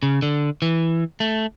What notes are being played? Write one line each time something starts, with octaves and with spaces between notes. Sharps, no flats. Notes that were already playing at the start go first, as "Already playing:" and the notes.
C#3
D3
E3
A3